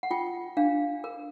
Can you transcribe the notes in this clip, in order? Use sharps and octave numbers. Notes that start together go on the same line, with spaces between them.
F#5
F4 G5
D4 F5
A#4